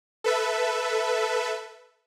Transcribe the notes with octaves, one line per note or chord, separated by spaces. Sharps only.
A4 B4 E5